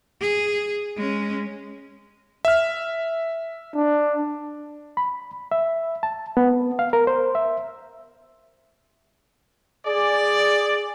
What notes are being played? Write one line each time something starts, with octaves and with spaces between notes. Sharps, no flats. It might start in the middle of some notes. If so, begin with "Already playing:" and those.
G#4
G#3 C#4
E5 F6
D4
B5
E5
A5
B3
F5
A#4
C5
E5
G#4 D5